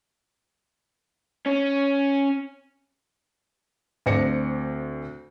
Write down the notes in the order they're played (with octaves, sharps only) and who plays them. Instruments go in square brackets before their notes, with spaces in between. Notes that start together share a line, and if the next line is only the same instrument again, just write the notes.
[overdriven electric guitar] C#4
[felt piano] D2 C4 D5 A#6 C#7